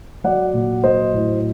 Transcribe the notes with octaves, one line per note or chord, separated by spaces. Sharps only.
F#3 D5 F#5
A#2
F#3 C5 D#5
A2